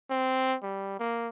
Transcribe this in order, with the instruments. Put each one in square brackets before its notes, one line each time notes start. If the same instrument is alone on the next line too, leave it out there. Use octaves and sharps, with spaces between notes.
[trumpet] C4
G3
A#3